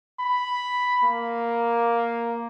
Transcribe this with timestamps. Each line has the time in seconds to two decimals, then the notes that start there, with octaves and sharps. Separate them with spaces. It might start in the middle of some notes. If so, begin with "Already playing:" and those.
0.20 B5
1.04 A#3